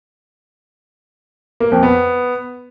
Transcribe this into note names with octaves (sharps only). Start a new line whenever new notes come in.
A#3
F2
B3